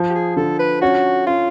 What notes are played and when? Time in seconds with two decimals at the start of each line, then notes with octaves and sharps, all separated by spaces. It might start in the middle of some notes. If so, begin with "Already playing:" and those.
Already playing: F3
0.10 G4
0.15 G#4
0.37 D3 A4
0.59 B4
0.82 C#4 F#4
1.27 C#4 F4